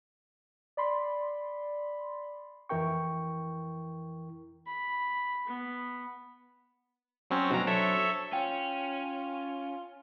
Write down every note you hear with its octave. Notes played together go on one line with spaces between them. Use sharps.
D5 B5 C6
F2 E3 E4 A#4 G5 C#6
B5
B3
F#3 C4 C#4
B2 F#3 D4 C5 A#5
A4 C#5 E5
C#4 F4 G5